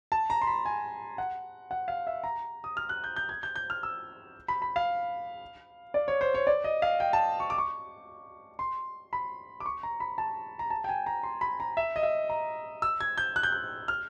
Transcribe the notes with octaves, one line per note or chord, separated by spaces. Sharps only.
A5
A#5
C6
B5
G#5
F#5
F#5
F5
E5
A#5
D#6
F6
F#6
G6
G6
G#6
G6
G6
F6
E6
B5
B5
F5
D5
C#5
C5
C#5
D5
D#5
F5
G5
A5
C#6
D6
C#6
C6
B5
D6
C#6
A#5
B5
A5
A#5
A5
G5
G#5
A#5
C6
B5
A#5
E5
D#5
E5
A#5
E6
G#6
G6
F#6
G6
F#6
F6